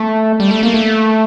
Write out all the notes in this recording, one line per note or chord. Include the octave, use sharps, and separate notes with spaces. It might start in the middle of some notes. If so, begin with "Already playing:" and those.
Already playing: A3
G3
A3
A#3
A3